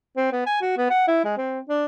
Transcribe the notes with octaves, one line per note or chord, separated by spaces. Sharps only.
C4
B3
G#5
F#4
B3
F#5
E4
G#3
C4
D4